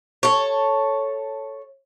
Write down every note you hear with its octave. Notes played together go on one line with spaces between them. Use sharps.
A4 C#5